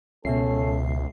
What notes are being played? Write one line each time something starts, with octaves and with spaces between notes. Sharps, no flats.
C#2 B2 C#4 A4 E5 C7